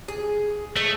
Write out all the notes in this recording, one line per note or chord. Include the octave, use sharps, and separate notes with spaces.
G#4
A3 D#5